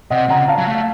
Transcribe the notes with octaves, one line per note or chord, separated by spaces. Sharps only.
C3 D#5 F#5
C#3 F#5 A#5
F5 A5
F#3
A3